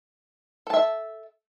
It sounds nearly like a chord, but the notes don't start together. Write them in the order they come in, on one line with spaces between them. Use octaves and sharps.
A4 A5 E5